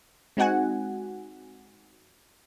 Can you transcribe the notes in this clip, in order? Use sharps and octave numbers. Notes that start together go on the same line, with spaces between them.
G#3 C4 D#4 F#4 F#5 G#5